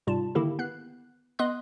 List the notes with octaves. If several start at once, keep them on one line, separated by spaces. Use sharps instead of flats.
G#2 C3 G3 F4 A5
D3 D#3 A#3 E4 G4 A4
B3 F#6 C7
B3 D#5 C6 D#6 F#6